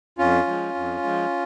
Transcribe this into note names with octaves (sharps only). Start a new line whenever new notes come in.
F2 C#4 F4
F3 G#3
F2
F3 G#3